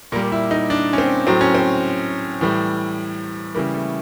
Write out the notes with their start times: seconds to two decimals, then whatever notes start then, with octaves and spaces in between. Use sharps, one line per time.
0.12 A#2 A#3
0.16 G3
0.32 E4
0.51 D#4
0.70 D4
0.93 C#4
0.98 C4
1.27 A2 F#3 C4
1.41 C#4
1.55 C4
2.41 A2 E3 G3
3.55 C#3 E3 G3 A#3
3.74 A3